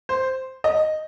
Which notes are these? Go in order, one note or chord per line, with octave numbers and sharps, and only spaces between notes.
C5
D#5